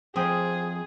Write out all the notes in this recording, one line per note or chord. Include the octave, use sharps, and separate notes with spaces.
F2 C4 G#4 C5 G5 D#6